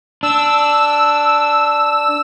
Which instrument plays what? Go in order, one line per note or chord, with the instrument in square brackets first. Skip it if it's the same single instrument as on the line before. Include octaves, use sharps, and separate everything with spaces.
[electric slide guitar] D4 [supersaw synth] E6